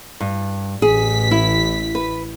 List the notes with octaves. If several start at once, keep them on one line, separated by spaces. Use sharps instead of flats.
G2
A1 G#4 B6
E4
B4